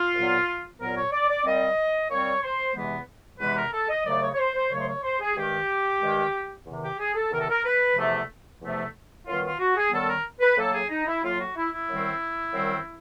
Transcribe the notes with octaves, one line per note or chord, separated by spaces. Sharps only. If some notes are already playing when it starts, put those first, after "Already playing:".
Already playing: F4
C2 A#2 F#3 B3
C2 A#2 F#3 B3 A#4
C#5
D5
D5
A#2 G3 C4 D#5
A#2 G3 C4 C#5
C5
E2 C3 E3 G#3 B3
E2 C3 E3 G#3 B3 B4
A#4
A4
D#5
D#2 C#3 F#3 A3 D5
C#5
C#5
C5
C5
D#2 C#3 F#3 A3 C#5
C5
C#5
C5
G#4
G2 D#3 G#3 G4
G2 D#3 G#3
E2 C3 D#3
G4
G#4
A4
E2 C3 D#3 A#4
A4
A#4
B4
E2 C3 F3 A3
E2 C3 F3 A3
F#2 D#3 G3 B3 F4
F4
F#4
G#4
F#2 D#3 G3 B3 A4
A#4
B4
A2 F#3 A#3 A4
G#4
D#4
E4
A2 F#3 A#3 F4
F#4
E4
E4
F#2 D#3 G3 C4
F#2 D#3 G3 C4